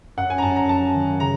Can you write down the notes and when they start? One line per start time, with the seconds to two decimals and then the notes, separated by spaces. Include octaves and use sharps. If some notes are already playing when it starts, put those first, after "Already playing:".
0.17 F#2 F#5
0.30 G#5
0.38 A#5
0.42 F#2 A5
0.56 A#5
0.68 F#3 A5
0.94 D#3
1.20 C#3 A#5